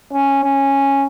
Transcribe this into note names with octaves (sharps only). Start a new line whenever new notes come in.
C#4
C#4